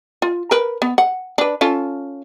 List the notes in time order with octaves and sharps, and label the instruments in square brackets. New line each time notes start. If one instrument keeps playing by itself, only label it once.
[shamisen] F4
A#4 B4
B3
F#5
D4 B4
C#4 F4 A4